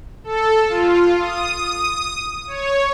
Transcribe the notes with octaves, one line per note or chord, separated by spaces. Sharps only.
A4
F4
D#6
C#5